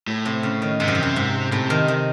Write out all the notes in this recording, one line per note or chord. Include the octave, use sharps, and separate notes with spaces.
A2
C3
C#3
D#3
G#2 C3
F#2
E2
F#2
G#2
A2 C3
D#3
D#3